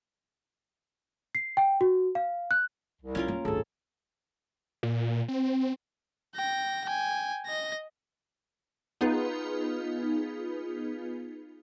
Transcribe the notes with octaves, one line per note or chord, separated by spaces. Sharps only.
C7
G5
F#4
F5
F#6
C2
B3 C#4 F4 A#4
A#3
D1 G#1 G#4 A4
A#2
C4
G5 A#6
G5 G#5
D#5 A#6
B3 D#4 F4 G#4 B4